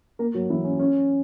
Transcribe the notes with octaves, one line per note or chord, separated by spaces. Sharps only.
A#3 A#4
F#3 F#4
E3 E4
C#4
C#4